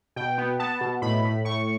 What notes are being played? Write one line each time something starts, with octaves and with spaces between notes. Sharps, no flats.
B2 G5
B3
B3 A5
B2
A2 B5
A2
A2 C#6